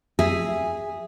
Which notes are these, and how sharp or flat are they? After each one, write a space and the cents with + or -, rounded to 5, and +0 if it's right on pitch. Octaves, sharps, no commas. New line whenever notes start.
G#4 -10 E5 +0